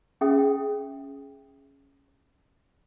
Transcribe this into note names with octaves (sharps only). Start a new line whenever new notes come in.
C#4 G#4 E5 G5 D#6